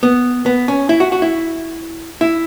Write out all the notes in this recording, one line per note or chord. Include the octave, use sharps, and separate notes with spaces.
B3
B3
C#4
E4
F#4
F#4
E4
E4